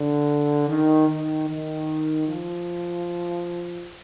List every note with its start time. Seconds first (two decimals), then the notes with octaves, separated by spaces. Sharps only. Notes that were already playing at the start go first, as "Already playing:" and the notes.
Already playing: D3
0.68 D#3
1.08 D#3
1.48 D#3
2.27 F3